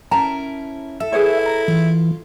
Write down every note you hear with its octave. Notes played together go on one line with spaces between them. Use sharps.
C#4 E4 A#4 A5 A#5
A4 E5
E4 G#4 B4 C#5
A#5
E3 F4